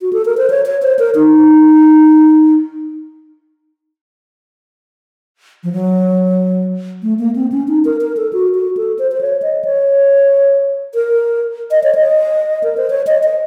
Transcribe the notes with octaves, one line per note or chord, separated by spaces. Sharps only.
F#4
A4
A#4
C5
C#5
C#5
C5
A#4
D#4
F3
F#3
A3
A#3
C4
C#4
D#4
A#4
A#4
A4
F#4
F#4
A4
C5
C5
C#5
D#5
C#5
A#4
D#5
C#5
D#5
A#4
C5
C#5
D#5
D#5